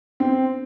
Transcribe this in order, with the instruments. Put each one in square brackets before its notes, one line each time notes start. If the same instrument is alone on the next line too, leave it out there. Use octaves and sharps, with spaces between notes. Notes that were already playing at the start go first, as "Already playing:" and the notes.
[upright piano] C4